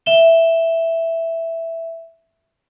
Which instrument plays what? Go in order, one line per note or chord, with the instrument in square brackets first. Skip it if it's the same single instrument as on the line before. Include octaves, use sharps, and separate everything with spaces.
[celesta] E5 E7 G7